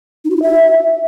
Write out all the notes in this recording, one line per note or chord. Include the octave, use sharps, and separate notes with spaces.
D#4
F#4
E4
E5